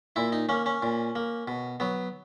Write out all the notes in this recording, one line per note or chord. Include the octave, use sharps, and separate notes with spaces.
A#2 E4
D#4
A#3 C#4
C#4
A#2
A#3
B2
F#3 B3